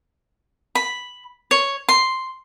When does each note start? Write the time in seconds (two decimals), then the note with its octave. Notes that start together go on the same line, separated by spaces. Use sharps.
0.75 B5
1.51 C#5
1.89 C6